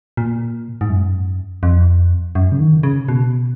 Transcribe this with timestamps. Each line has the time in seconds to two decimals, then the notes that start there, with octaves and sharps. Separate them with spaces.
0.17 A#2
0.81 G#2
0.90 F#2
1.63 F2
2.35 F#2
2.52 C#3
2.60 D#3
2.83 C#3
3.08 B2